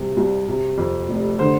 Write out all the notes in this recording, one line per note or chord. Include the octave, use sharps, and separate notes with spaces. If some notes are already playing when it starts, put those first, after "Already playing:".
Already playing: C2 C3
C2
C3
F2
F1
D3 C5